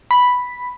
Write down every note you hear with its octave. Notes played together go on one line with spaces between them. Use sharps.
B5